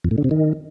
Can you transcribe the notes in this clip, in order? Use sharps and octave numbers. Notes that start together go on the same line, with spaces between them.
F2
A2
D3
C3
D#3